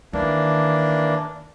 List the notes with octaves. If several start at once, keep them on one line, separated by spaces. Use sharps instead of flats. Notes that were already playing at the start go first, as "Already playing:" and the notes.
D#3 E3 A#3 D4